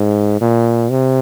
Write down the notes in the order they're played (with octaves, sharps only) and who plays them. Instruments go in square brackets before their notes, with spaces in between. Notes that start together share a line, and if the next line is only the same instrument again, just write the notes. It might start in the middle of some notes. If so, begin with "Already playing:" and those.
Already playing: [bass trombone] G#2
A#2
C3